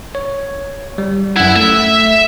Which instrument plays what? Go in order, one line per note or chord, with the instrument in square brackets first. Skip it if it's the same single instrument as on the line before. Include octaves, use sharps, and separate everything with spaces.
[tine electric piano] C#5
G3
[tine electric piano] F#2 F#5 [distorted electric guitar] E4
[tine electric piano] A3 [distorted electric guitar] E5